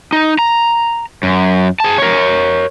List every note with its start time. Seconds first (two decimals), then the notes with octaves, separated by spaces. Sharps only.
0.13 D#4
0.39 A#5
1.23 F#2
1.80 G#4 A5
1.98 A#4 C#5